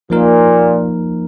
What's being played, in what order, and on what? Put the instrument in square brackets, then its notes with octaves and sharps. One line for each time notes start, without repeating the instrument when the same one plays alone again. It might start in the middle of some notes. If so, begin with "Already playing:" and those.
[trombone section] A#2 [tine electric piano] F3 A#3 D#4 A#4